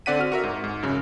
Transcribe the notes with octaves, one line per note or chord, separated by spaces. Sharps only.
D3 C4 D5 F#5 B6 D#7
F#4 F6
F#4 A#4 E5
G#2
G#2
F#2 C#3